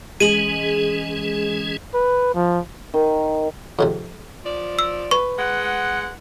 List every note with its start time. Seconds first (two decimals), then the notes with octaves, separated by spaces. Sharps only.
0.20 E3 G#3 C#4 G#4 D#7 F#7
1.94 B4
2.34 F3
2.94 D#3
3.79 F2 G#2 C3
4.44 F3 D5
4.79 E6
5.11 B4 C#6
5.39 G#3 F#5